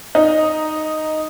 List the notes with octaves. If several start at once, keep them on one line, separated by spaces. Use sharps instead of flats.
D#4